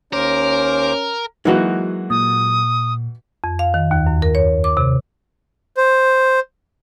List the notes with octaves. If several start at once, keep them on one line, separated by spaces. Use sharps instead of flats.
D#2 C#4 A#4 C5 D6
E3 F#3 G#3 A#3 D#4 F#4
A#2 D#6
F2
F5
D#3
D#2
F#2
A#4
C#5
D6
C3
C5